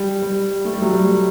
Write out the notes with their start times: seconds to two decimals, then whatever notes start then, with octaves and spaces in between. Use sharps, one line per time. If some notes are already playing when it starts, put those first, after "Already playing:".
Already playing: G3
0.22 G3
0.65 A3
0.73 G3
0.82 F#3 A3
0.93 G3